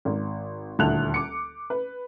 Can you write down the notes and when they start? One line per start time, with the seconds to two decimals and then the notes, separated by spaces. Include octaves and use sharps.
0.05 G#1
0.79 D#1 D2 E4 A5 F#6 F7
1.14 D6 C#7
1.70 B4